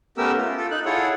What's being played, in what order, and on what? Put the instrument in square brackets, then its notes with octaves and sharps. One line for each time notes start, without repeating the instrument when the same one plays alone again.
[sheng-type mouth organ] A3 B3 C#4 G4 A#4 E6
F4
F4 A4
D#4 F#6
E4 F4 G#4 A4 C#5 F#5